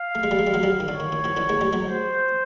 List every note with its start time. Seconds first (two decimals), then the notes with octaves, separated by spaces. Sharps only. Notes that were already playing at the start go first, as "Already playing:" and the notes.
Already playing: F5
0.15 A3
0.23 G#3
0.31 G3 A3
0.39 G#3
0.47 G3
0.54 F#3 G#3
0.63 F3 G3
0.80 D#3
0.88 D3 C#5
1.00 D#3
1.12 D#3
1.24 D#3 F3
1.37 D3 E3
1.49 G#3 A#3
1.61 G3 A3
1.73 F#3 G#3
1.86 C5